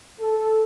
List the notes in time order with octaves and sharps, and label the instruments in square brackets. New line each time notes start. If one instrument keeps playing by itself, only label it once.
[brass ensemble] A4